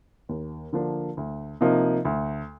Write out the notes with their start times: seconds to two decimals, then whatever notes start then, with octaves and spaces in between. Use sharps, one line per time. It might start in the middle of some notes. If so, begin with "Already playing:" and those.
0.29 D#2
0.73 D3 F3 A#3 D4
1.17 D2
1.61 C3 F3 A#3 D#4
2.05 D2